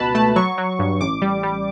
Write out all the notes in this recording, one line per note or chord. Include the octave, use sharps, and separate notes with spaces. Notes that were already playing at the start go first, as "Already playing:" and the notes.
Already playing: C#2 B2 B4 A5 B5
A3 A5
F#3 C#6
F#3
G2
A1 D6
G3
G3